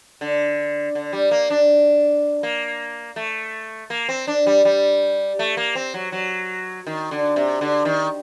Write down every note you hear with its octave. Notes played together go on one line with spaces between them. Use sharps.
D3
D3
G3
A#3
D4
A#3
A3
A#3
C4
D4
G3
G3
A3
A#3
C4
F#3
F#3
D#3
D3
C3
D3
D#3